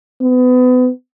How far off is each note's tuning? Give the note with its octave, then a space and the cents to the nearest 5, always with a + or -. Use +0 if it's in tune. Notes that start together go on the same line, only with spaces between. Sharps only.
B3 +30